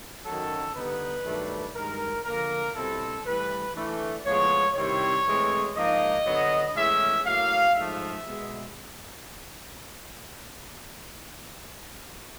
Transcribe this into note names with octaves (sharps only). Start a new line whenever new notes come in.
F#2 D#3 F#3 A4
D3 G3 B3 D#4 B4
G2 D#3 F#3 A3 D4
G2 D#3 G#3 A#4
D3 F3 A#3 A#4
B2 G3 C4 E4 A4
A2 E3 G3 B4
E3 A3 D4
A2 F3 G#3 B3 C#5
C3 D#3 G3 C4 E4 C#5
A2 E3 G#3 C4
G#2 F3 A#3 D#4 D#5
D3 F#3 B3
A2 E3 G#3 C#4 E5
A2 F#3 A#3 F5
G#2 F3 A3 E5
B2 G#3 B3